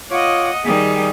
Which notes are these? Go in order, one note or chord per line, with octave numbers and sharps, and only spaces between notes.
F4 C#5 D#5 F#5 D6
D#3 G3 G#4